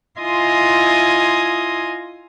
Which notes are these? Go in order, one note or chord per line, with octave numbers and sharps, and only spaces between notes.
E4 F4 D#5 G#5 C6 D#6